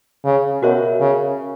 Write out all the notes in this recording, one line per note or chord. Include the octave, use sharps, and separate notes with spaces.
C#3
B2 F#4 A#4 C#5 E5
C#3